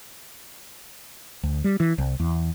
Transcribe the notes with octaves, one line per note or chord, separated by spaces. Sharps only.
D2
G3
E3
C2
E2